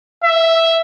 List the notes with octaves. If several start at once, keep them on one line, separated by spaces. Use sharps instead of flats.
E5